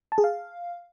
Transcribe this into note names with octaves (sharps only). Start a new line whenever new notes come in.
A5
G#4
F5